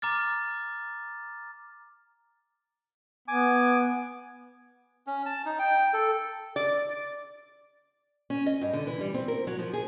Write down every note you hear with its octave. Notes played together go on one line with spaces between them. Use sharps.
A#5 D6 F6 A6
B3 G#5 D6
C#4
A5
D#4
G5
A4
D5
C#4
D#5
G2
D3
E3
G3
C4
A#4
F#3
F3
G#4